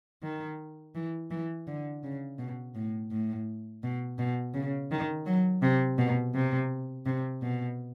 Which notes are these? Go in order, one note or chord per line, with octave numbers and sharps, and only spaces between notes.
D#3
E3
E3
D3
C#3
B2
A2
A2
B2
B2
C#3
D#3
F#3
C3
B2
C3
C3
B2